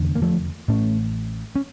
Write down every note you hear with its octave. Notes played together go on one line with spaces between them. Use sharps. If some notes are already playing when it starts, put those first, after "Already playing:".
Already playing: F1 E2 D3
A#3
F3 A3
A1 A2 A3 C#4
C#4